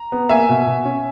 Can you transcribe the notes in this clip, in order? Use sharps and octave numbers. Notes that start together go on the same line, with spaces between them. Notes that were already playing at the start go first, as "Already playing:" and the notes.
Already playing: A#5
B3
A#3 E5 G#5
B2
B2
C#4